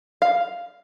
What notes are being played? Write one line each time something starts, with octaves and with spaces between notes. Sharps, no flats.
F5